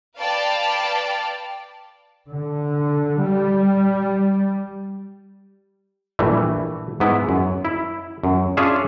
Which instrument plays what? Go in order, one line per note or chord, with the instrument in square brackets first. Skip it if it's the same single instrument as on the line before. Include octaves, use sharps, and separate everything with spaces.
[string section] B4 D5 F5 G5 A5
[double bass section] D3
G3
[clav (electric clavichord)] A#1 E3 G3 A3
G#2 B3 E4
F#2
E4
F#2
C#4 D4 F4 G#4 E5